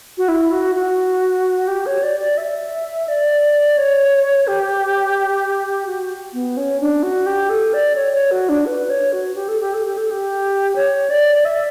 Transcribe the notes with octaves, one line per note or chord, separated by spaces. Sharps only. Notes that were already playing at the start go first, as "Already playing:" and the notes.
F#4
E4
F#4
F#4
G4
C#5
D5
D5
E5
D5
C#5
G4
F#4
B3
C#4
D4
F#4
G4
A4
D5
C#5
C#5
F#4
D4
B4
C#5
F#4
G4
A4
G4
A4
G4
A4
G4
C#5
D5
E5